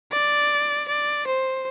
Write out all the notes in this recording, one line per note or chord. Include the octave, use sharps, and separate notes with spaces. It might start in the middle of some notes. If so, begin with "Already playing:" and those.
D5
D5
C5